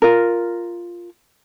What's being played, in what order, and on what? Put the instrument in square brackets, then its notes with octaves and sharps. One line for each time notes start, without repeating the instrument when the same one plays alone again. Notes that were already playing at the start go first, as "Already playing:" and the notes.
[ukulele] F4 A#4